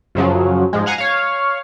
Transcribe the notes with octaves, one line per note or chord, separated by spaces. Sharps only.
F#2 C#3 F3 F#3
G#2 F3 G#3
F5 F#5 G#5 A#5
C#5 F5